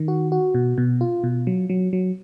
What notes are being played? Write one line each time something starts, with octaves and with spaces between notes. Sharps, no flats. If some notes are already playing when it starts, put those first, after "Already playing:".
Already playing: D#3
F#4
F#4
B2
B2
F4
B2
F#3
F#3
F#3